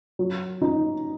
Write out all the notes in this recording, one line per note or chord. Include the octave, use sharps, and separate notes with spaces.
F#3
D#4